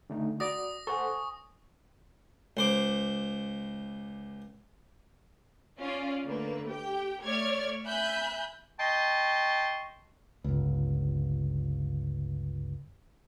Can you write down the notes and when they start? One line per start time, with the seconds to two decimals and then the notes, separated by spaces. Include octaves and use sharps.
0.10 D3 A3 D#4
0.40 F#4 D5 D#6 A#6
0.87 A4 C5 F#5 G#5 C#6
2.57 C#2 C5 D6
5.79 C#4 F4 D5
6.23 D3 A3 A#3 B4
6.69 G4 G5
7.24 A3 C#5 D5 F6 G#6
7.86 E5 G#5 B5 F#6 G6
8.79 D#5 G5 A5 C6 C#6
10.44 G1 C#2